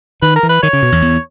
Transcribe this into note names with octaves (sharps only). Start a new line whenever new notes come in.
D#3 B4
A#4
E3
B4
D#3 C#5
C#3
B2
E2
E2